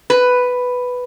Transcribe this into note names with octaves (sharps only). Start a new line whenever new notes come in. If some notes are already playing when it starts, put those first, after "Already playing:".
B4